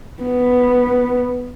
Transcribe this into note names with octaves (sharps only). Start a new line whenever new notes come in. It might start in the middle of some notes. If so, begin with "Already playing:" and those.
B3